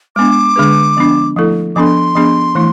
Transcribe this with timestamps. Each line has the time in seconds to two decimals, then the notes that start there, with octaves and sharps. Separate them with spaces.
0.16 G#3 B3 D4 D6
0.56 D3 G#3 D4 G#4 B4
0.97 F3 B3 D4
1.36 F3 A3 E4 A4
1.75 F3 B3 D4 A4 C6 D6
2.15 F3 B3 D4 G#4
2.55 E3 A3 E4